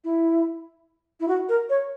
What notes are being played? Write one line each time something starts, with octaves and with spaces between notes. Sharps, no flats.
E4
E4
F#4
A#4
C#5